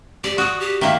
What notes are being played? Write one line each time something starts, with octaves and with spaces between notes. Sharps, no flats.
G4 D5
F#4 D#6
G4
D#3 A#3 E5